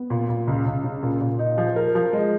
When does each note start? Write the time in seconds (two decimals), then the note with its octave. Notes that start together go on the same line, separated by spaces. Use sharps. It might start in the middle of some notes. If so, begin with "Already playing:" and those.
Already playing: B3
0.10 A#2
0.29 A#2
0.47 C#2
0.66 C#2
0.84 C#3
1.03 A#2
1.21 A#2
1.39 D#4
1.58 F3
1.76 A#4
1.95 F3
2.13 G#3